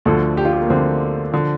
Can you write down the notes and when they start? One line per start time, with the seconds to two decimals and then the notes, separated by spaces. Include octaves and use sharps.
0.05 D2 D3 F3 A4
0.37 G4
0.45 F4
0.53 G4
0.62 A#3
0.69 D2 D3 F3 C4
1.32 D3 F3